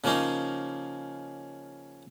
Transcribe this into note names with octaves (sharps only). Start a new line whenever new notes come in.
C#3 F3 A#3 C#4 D#4